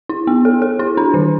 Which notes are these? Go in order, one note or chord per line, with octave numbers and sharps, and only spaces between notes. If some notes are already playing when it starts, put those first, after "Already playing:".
E4
B3
A4
A4
E4
D4
D#3